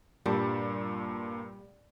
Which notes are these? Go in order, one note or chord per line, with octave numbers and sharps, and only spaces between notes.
G2 A#2 G3 A5